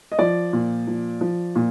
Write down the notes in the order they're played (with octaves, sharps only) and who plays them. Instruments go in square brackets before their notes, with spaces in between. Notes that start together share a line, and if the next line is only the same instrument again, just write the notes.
[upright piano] D#5
F3 D5
A#2
F3
F3
A#2